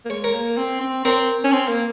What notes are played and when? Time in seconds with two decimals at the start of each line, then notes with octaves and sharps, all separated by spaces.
0.06 A#3
0.10 G#3 C#5
0.24 A#4 C#5
0.34 A#3
0.57 C4
0.81 C4
1.05 C4 A#4 C#5
1.44 C#4
1.53 C4
1.68 A#3